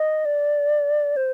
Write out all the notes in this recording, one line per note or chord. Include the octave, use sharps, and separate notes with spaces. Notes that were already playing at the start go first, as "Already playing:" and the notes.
Already playing: D#5
D5
C5